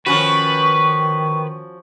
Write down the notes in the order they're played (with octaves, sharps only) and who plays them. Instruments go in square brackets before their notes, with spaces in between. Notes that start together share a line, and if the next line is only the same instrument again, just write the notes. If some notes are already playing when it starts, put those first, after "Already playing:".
[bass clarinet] D#3 [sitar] F3 C#4 F#4 [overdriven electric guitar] B4 [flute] C#6